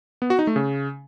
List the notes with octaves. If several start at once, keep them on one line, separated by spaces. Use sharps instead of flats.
B3
F#4
D#4
A3
C#3